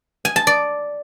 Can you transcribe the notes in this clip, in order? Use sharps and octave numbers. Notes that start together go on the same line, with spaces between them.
G#5
A5
D5